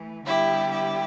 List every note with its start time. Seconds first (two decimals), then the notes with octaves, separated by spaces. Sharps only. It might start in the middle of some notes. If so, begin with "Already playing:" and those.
Already playing: E3 A3
0.25 D3 G3 B3 E4 G4
0.70 E4 G4